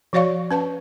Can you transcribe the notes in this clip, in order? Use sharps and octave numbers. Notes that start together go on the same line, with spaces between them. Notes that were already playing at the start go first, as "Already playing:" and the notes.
F3 F#4 C#5 D5 F5 C#6
C#4 B4 A5